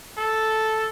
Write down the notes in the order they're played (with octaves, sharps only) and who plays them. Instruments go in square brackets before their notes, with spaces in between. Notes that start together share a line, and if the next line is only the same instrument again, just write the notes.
[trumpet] A4